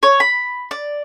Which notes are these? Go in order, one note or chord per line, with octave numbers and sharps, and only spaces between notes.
C#5
B5
D5